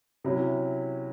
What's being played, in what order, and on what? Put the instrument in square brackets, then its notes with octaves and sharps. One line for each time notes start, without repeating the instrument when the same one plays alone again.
[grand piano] C3 F#3 C#4 E4